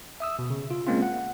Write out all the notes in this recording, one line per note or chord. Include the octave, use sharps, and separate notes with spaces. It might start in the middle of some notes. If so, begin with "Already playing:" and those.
E5 D#6 E6
B2
C#3
F4
G#3 A#3 C4 C#4 F4
F#5